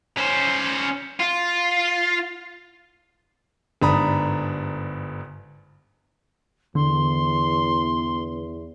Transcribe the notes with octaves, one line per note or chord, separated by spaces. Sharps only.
C#4 C5
F4
G1 G#2 D4 A#5 B5 D#6
E2 D3 C6